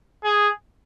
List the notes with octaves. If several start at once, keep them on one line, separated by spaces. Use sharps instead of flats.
G#4